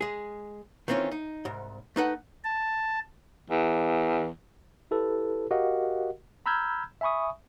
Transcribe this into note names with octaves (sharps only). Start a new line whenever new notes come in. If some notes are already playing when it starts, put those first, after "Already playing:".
G#3 G#4
D#3 E3 C4 C#4 F4
D#4
C2 G#2
A3 D#4 B4 F#5
A5
E2
E4 G4 A4 B4
F#4 G4 A#4 D#5 F5 F#5
A#5 B5 E6 F6 G6 G#6
E5 G#5 B5 C#6 D#6